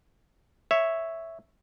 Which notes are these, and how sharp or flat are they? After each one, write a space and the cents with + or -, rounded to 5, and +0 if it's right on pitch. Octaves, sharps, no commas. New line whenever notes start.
C#5 +0 E5 +0